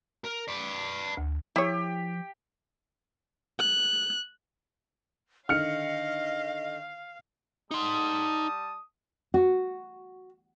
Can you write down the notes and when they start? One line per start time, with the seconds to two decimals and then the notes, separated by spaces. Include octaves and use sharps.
0.24 A#4
0.48 B4 D5
1.17 D2
1.56 F3 E4 G4 C#5
3.59 F#6
5.49 D3 D#3 D#5 F5 F6 C#7
7.71 G3 D#4 A5 C6 D#6
9.34 F#4